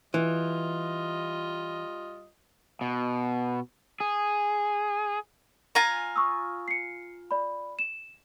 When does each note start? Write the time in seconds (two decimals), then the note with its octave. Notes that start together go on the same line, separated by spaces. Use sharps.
0.14 E3 G3 F4 D#5
2.81 B2
4.00 G#4
5.75 F4 G#5 A#5
6.16 C#6 D#6 E6
6.68 C7 C#7
7.31 D5 B5
7.79 E7